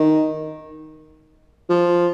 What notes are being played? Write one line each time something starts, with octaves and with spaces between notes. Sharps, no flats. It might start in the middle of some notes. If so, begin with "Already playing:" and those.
Already playing: D#3
F3